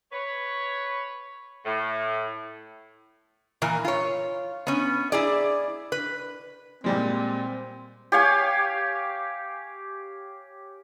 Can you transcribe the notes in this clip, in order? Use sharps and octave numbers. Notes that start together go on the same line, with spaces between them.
B4 C#5
A2
A#2 E3 A#4
F4 C#5
B3 C#4
E4 G#4 D5
B4
A#2 G3 G#3 C4
G4 C#5 F5 G#5